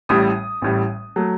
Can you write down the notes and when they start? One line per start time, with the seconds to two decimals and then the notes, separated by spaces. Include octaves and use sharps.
0.09 A1 A2 G3 D#6
0.62 A1 A2 G3
1.16 F#3 A3